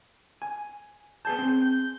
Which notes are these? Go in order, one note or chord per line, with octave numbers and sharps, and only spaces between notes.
G#5
B3 G#4 A5 G6
C4 G#4
G6